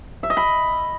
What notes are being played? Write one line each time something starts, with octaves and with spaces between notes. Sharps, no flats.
E5
D#5
B5